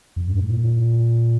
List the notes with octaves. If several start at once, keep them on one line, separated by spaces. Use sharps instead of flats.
F2
G2
A2
A#2